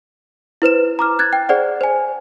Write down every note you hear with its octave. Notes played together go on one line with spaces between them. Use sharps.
E4 B4 C5 E7
A#5 D6 F6
F#6 G#6 A6
G5
G#4 C5 D5 F#5
C5 G#5